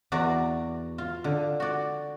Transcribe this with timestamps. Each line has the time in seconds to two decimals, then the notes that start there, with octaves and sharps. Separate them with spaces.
0.12 E2 F#4 D5 A#5
0.98 F4
1.24 D3
1.60 F#4 D5